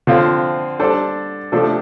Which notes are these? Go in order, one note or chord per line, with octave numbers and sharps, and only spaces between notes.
D3 F3 C4 F4 C5
G3 D4 A4 C5
C3 F3 A3 D4 A4